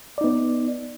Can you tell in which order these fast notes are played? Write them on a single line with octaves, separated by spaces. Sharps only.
D5 D#4 B3